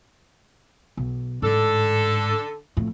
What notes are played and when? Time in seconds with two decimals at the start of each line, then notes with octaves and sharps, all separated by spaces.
0.97 B1
1.42 A1 G#2 D3 D4 A4
2.77 F2 A2